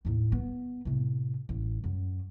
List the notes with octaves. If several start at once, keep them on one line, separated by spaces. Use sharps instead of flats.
D#2 A2
B3
A2 C3
A1
F#2